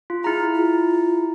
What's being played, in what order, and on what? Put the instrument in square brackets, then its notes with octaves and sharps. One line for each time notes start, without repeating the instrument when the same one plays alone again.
[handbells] F4
[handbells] E4 A#5 [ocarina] G#4
[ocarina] F4